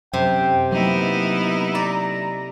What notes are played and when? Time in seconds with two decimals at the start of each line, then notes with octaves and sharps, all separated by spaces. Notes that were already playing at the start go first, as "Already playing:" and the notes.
0.13 F#2 C3 G5
0.72 F#3 A#3 B3 D#4 E4
1.75 D5 A#5